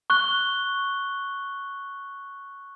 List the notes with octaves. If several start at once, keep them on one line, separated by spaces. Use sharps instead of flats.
C#6 F#6 G7